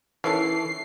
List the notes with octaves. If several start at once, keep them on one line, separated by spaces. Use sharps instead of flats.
D#3 E3 C#4 A4 C7